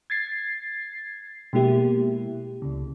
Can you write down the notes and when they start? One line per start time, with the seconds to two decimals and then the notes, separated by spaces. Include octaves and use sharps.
0.10 G#6 A6 C7
1.53 B2 G#3 A#3 E4 G4
2.62 C#2 C#3